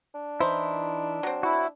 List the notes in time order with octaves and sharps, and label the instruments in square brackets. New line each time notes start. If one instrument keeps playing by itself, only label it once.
[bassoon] D4
[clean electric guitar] E3 D#4 E4 [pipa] C5
[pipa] F#3 C4
[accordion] E4 [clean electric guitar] F#4